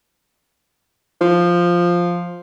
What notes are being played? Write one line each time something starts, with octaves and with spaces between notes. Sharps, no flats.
F3